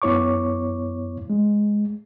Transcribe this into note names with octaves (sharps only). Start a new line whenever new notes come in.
F#2 B3 E4 C#5 C#6 D6
G#3